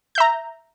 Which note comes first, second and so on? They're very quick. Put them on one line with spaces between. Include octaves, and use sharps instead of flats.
G6 E5 A#5